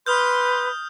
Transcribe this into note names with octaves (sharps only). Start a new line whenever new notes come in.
B4 C6 D#6 F6 G6